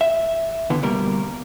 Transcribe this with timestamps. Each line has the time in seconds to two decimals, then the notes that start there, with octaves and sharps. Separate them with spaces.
0.01 E5
0.70 D3 E3 B3
0.82 D2 B2 G3 A#3 A#4